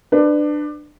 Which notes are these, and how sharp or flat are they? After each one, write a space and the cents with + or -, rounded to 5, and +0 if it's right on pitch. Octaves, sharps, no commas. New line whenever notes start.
D4 +20 B4 +20